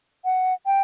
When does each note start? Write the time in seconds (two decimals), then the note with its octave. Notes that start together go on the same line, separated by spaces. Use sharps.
0.25 F#5
0.66 G5